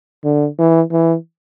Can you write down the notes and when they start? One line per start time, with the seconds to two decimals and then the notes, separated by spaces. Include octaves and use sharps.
0.24 D3
0.58 E3
0.92 E3